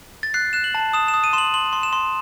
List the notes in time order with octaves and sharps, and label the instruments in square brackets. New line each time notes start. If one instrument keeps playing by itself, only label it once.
[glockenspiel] A6
F#6 C7
F#6 E7
F#7
A5
D#6 E7
E7
D#6
D#7
C6 E7
F#7
C6 F#7
C6
E7
C6